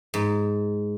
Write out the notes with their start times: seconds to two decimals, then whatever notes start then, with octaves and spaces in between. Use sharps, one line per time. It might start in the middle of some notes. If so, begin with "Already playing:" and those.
0.14 G#2